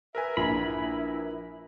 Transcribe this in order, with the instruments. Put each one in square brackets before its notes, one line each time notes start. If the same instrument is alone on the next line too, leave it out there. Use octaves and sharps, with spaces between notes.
[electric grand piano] A#4 B4 G#5 [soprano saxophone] E5
[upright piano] A#1 [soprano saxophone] E4 [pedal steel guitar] B5